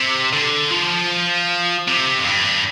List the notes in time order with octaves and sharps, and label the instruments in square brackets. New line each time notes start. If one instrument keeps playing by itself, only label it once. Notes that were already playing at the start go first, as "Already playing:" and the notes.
Already playing: [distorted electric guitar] C3
D3
F3
C3
F2
G2